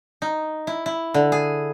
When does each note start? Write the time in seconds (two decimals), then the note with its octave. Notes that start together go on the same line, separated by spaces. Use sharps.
0.22 D#4
0.67 E4
0.86 E4
1.14 D3
1.32 G#4